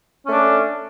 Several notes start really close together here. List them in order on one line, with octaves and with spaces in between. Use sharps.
C#4 A3 D4